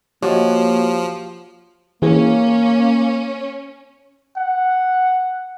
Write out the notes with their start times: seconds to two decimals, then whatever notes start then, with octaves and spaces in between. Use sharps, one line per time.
0.22 F3 A#3 F#4 G4 C#5 G#6
2.02 E3 A#3 C#4 G#4
4.37 F#5